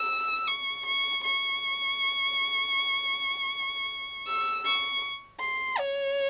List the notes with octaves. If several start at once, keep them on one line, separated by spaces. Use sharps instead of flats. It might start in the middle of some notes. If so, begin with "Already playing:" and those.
Already playing: E6
C#6
C#6
C#6
E6
C#6
C6
C#5